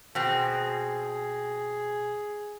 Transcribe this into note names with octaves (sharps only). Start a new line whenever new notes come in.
B2 C4 G#4